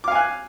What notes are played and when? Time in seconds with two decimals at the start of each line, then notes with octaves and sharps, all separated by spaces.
0.04 D6
0.08 F5
0.12 G#5
0.15 F#6